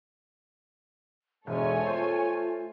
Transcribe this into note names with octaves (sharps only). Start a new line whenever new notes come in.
E1 G#2 A4 C#5 E5 G#5
A3 F4 C5